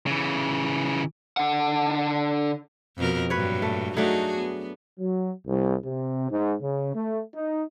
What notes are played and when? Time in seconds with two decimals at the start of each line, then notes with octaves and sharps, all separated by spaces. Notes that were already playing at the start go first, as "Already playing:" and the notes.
0.07 C#3 E3
1.37 D3 F#5
2.97 F2 B2 A#4
3.30 G2 A#2 F#3 B4 C#5
3.62 A3
3.97 F#3 A3 D4 D#4 F#4 G#4
4.37 B3
5.00 F#3
5.48 C2
5.84 C3
6.31 G#2
6.62 C#3
6.95 A3
7.35 D#4